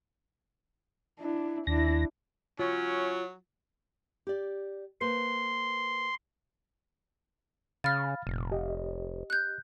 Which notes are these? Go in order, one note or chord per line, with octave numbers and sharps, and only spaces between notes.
D4 E4
D#2 D4 E4 A#6
F#3 C#4 F4 C#5
G4 D5
A#3 B4 C5 C6
C#3 F5 B5 F6 A6
F1 A#2
G4 D#5
F#6 G6